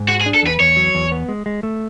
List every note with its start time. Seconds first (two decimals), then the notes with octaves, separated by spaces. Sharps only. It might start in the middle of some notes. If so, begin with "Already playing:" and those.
Already playing: G#2
0.08 G#3 F#4
0.21 G#4
0.26 D4
0.34 A4
0.43 E2 B4
0.60 E2 C#5
0.76 F#3
0.95 E2
1.12 B3
1.29 G#3
1.46 G#3
1.63 A3